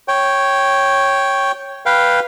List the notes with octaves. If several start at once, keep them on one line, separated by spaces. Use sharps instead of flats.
C#5 G5
B4 F5 G5